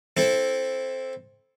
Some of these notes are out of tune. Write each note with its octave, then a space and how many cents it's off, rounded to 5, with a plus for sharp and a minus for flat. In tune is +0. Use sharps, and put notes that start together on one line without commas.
C4 +5 E4 +0 A4 -10